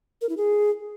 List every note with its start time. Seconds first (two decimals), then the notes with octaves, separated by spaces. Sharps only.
0.22 A#4
0.29 E4
0.37 G#4